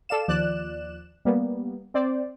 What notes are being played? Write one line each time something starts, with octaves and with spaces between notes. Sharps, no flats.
A4 D5 F5 E7
D#2 F3 D5 F#6 E7
G3 A#3 B3
C4 C5 D5